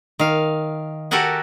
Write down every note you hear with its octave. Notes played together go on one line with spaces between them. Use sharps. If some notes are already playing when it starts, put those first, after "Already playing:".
D#3 F5
F#4 G4 A4 A#4 F#5 G#5